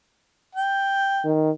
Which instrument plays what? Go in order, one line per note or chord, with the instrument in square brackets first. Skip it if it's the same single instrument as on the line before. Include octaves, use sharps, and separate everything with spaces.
[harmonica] G5
[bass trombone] D#3